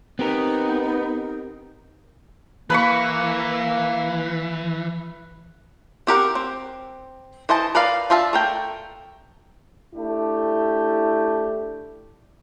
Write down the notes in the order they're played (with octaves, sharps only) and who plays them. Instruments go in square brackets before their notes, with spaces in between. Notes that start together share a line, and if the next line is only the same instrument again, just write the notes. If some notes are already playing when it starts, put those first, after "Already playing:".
[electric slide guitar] B3 [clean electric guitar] C4 G4 A#4 [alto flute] D#4
[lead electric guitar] E3 [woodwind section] A#3 [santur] B4 B5 C#6
[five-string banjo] C4 G4 A#4 F#5
C4
E3 C5 D#5 A5
A#4 B4 D5 F5
D4 F4 E5 F5 A5
A3 A#4 G5
[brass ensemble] A3 D4 E4 G4